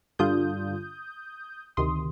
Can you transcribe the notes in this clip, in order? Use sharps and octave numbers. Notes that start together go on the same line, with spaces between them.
G2 D3 G3 D4 F4 D#6 G6
D2 C3 D#3 C6 D#6